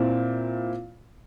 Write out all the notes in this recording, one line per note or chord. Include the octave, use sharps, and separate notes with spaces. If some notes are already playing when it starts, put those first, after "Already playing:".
Already playing: A#2 C4 E4